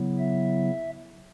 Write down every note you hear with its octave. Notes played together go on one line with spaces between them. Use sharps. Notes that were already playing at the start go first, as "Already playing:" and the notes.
Already playing: C#3 F#3 B3 E4
E5